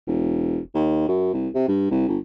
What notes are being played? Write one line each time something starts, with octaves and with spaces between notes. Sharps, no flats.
E1
D#2
F#2
C2
C3
G2
C2
G1